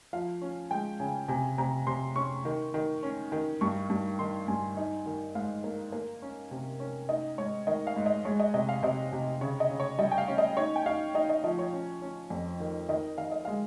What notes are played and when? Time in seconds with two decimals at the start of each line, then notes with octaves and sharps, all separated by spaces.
0.13 F3 F5
0.42 C#4
0.71 G#3 G5
1.00 C#3 G#5
1.28 C3 G#5
1.58 C3 A#5
1.87 C3 C6
2.16 C#4 C#6
2.45 D#3
2.74 D#3
3.03 C#4
3.32 D#3
3.61 G2 C#6
3.90 G2
4.19 D#3 C6
4.48 G2 G#5
4.77 D#4
5.06 D#3
5.35 G#2 F5
5.64 A#3
5.92 A#3
6.22 C#4
6.51 C3
6.80 C#4
7.09 D#4 D#5
7.38 G#2 C#5
7.67 D#3 D#5
7.87 F5
7.96 G#2
8.06 D#5
8.25 G#3 C#5
8.40 D#5
8.54 C3 D#5
8.69 F5
8.83 C3 D#5
9.12 C3
9.41 C#3 C#5
9.60 D#5
9.70 C#3
9.80 C#5
9.99 G3 D#5
10.11 G5
10.18 F5
10.28 C#4
10.38 D#5
10.57 D#4 C#5
10.76 G5
10.86 D#4 F5
11.15 D#4 D#5
11.29 D#5
11.44 F3 D#5
11.59 C#5
11.73 C#4
12.02 C#4
12.30 F2
12.60 D#3
12.89 D#3 D#5
13.18 D#3 F5
13.31 D#5
13.45 G#3 F5